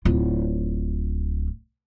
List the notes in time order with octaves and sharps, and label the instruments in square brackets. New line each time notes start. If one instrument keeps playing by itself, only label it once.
[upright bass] D1 F4